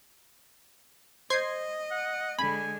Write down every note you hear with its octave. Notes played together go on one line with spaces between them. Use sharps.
C5 D#5 G#6 C7
F#5
D3 G#3 G#5 B5